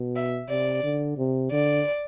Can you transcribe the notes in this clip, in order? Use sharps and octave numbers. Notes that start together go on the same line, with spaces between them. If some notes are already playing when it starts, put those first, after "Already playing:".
Already playing: B2
E5
C3 D5
D3
C3
D3 D5